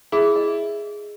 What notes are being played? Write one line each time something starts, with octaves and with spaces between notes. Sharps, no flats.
E4 G#4
D#5